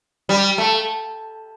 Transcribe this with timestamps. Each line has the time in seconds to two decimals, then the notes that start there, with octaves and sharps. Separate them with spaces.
0.29 G3
0.58 A3